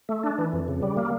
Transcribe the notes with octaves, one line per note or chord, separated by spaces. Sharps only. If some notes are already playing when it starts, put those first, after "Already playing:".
A3
D4
E3
F2
C#3
G3
A#3